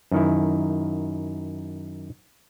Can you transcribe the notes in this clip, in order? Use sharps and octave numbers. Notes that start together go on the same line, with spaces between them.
F#2 D#3 E4